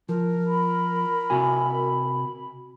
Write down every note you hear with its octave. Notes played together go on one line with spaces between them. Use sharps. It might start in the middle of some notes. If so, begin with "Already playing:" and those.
F3 A#4
B5
C3 F#4 G#5